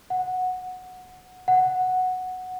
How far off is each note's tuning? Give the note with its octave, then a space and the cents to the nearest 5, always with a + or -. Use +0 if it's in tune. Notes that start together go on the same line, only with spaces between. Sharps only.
F#5 -10
F#5 -5